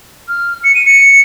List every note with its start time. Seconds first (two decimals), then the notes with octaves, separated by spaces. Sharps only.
0.28 F6
0.64 C#7
0.75 D#7
0.85 C#7